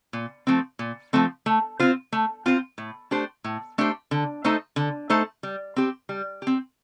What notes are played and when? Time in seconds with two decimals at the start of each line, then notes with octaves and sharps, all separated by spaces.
0.13 A#2
0.47 F3 A3 C4
0.79 A#2
1.13 F3 A3 C4
1.46 A3
1.80 C4 F4 C5
2.12 A3
2.46 C4 F4 C5
2.78 A2
3.11 A3 D4 G4 C5
3.44 A2
3.78 A3 D4 G4 C5
4.11 D3
4.44 A3 D#4 A4 C5
4.76 D3
5.10 A3 D#4 A4 C5
5.43 G3
5.76 C4 G4
6.09 G3
6.42 C4 G4